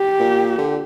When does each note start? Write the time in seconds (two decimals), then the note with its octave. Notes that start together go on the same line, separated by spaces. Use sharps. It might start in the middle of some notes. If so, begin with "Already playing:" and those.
Already playing: G4
0.20 A#2
0.58 D3